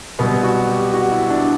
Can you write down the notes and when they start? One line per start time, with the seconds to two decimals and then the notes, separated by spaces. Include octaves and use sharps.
0.19 C2 B2 F#3 B3
0.43 F#4
0.69 G4
0.94 F#4
1.12 E4
1.30 D4